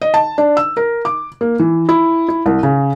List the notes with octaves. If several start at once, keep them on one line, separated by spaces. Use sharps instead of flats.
D#5
A5
D4
E6
A#4
D6
A#3
E3
E4
E4
C2
C#3